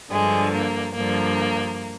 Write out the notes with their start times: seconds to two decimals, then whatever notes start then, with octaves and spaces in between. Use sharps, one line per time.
0.11 G2 D3 F3 G#3
0.54 A#3
0.95 G2 D3 F3 A#3